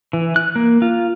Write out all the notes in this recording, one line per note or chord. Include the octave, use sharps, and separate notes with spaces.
E3
F#6
A#3
F4